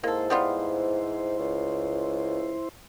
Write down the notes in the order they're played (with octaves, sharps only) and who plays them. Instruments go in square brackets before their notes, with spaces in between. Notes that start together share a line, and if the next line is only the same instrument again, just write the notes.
[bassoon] G#2 [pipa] A#3 A4 [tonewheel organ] E4 C5
[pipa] G3 B3 F4
[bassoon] C#2